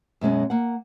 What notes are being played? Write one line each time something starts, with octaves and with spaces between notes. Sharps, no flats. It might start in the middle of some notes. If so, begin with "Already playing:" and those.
F#2 B2 G#3 C#4
A#3 F#5